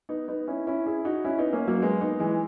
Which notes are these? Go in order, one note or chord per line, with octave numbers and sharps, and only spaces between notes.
B3 D#4
B3 D#4
C#4 E4
C#4 E4
E4 G#4
D#4 F#4
C#4 E4
B3 D#4
A#3 C#4
F#3 A#3
G#3 B3
B3 D#4
E3 G#3